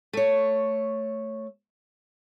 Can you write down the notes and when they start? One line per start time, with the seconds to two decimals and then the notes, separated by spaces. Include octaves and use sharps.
0.13 A3 C#5